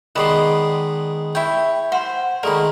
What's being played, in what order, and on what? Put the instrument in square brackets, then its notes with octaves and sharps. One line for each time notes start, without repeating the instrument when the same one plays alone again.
[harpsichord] D#3 G#3 B3 [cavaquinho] B4 D5 C6
[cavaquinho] E4 G5 [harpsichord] C#5
[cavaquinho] C5 [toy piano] F#5 C6
[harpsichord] D#3 G#3 A3 [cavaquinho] A#4 [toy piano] D5 B5